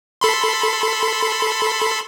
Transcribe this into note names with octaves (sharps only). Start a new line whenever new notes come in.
A4 B5 C6